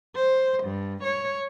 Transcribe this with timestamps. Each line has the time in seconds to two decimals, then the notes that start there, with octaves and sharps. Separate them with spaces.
0.17 C5
0.65 G2
1.05 C#5